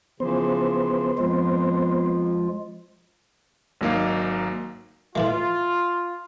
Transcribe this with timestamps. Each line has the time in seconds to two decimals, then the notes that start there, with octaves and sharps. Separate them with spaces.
0.20 C#3 E3 F3 B3 C5
1.18 F2 F3 G#3 F4
3.81 G#1 F#3 A#3 D#4 F5
5.15 A2 E3 G#3 F4